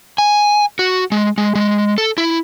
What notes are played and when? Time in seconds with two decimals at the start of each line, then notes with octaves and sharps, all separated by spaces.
0.18 G#5
0.79 F#4
1.12 G#3
1.38 G#3
1.55 G#3
1.98 A4
2.18 E4